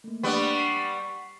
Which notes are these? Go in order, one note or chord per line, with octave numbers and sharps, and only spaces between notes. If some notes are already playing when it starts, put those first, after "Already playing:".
A3 A#3
G3 B3 D4 B4 C#6
C#6 B6 C7